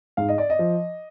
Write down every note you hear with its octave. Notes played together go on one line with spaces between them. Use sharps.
G#2 F5
D#5
D5
D#5
F3